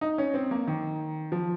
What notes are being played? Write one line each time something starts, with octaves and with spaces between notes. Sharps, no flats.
D#4
C#4
C4
A#3
D#3
F3